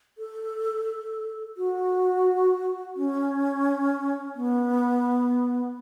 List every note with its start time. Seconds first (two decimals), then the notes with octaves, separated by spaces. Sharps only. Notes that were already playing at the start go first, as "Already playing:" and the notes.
0.18 A4
1.57 F#4
2.96 C#4
4.35 B3